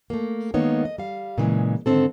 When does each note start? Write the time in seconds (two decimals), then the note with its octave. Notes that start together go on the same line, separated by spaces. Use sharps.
0.10 A3 A#3
0.54 D#3 G#3 A#3 B3 D#4 C#5
0.85 D#5
0.98 G3 F5
1.38 A#2 C#3 E3 G#3
1.86 G#2 D3 D#3 F3 C4 A4